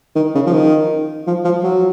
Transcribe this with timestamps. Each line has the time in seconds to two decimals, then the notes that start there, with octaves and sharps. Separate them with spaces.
0.16 D#3
0.35 C#3
0.47 F3
0.53 D#3
1.27 F3
1.45 F3
1.63 F#3